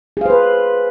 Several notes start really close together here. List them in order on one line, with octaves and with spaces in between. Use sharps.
G#4 F5 C5 B4